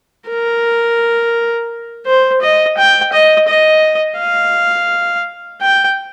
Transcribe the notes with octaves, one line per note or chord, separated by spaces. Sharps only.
A#4
C5
D#5
G5
D#5
D#5
F5
G5